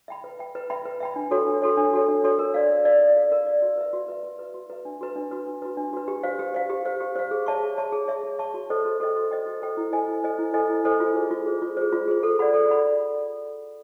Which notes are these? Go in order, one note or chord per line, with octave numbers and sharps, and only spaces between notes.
E5 G5 B5
B4
E5 G5 B5
B4
E5 G5 B5
B4
E5 G5 B5
D4
F#4 A4 C#5
D4
F#4 A4 C#5
D4
F#4 A4 C#5
D4
F#4 A4 C#5
A#4
D5 F5
A#4
D5 F5
A#4
D5 F5
A#4
D5 F5
F#4
B4 E5
F#4
B4 E5
F#4
B4 E5
F#4
B4 E5
D4
F#4 B4
D4
F#4 B4
D4
F#4 B4
D4
F#4 B4
G4
C5 F5
G4
C5 F5
G4
C5 F5
G4
C5 F5
G#4
C#5 E5 A5 C#6
G#4
C#5 E5 A5 C#6
G#4
C#5 E5 A5 C#6
G#4
C#5 E5 A5 C#6
F#4
A4 C5 D#5 G5
F#4
A4 C5 D#5 G5
F#4
A4 C5 D#5 G5
F#4
A4 C5 D#5 G5
E4
A4 C5 D#5 G#5
E4
A4 C5 D#5 G#5
E4
A4 C5 D#5 G#5
E4
A4 C5 D#5 G#5
F4
G#4 C5
F4
G#4 C5
F4
G#4 C5
F4
G#4 C5
A4
D5 F#5 B5
A4
D5 F#5 B5